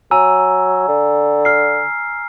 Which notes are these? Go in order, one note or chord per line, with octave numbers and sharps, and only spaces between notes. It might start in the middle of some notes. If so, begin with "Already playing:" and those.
F#3 G#5 A#5 E6
D3
F6 C7